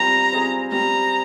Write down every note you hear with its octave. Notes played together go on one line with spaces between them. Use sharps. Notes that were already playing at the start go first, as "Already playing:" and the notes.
Already playing: G3 C4 F4 C5 A#5
C4 F4 G#4 C5
G3 A#5